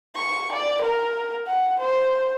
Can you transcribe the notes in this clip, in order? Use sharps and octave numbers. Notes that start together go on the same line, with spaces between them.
C#6
D5
A#4
F#5
C5